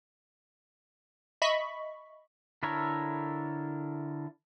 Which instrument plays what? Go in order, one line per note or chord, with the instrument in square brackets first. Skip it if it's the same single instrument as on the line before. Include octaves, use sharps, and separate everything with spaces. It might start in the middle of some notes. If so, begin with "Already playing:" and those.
[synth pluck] D#5 E5 B5 C#6 B6
[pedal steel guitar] D3 E4 A4 A#4 C#5